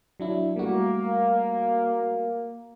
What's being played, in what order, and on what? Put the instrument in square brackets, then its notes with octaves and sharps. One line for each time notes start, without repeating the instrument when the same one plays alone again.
[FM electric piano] F#3 D4 E4
[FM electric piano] G3 A3 F#4 [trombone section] A#3